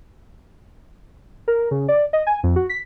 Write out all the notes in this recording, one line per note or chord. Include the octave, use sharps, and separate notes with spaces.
A#4
C#3
D5
D#5
G#5
F2
F#4
B6